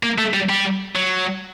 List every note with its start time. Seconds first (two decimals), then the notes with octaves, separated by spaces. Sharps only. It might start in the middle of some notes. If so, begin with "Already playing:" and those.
0.03 A#3
0.18 A3
0.34 G3
0.49 G3
0.95 F#3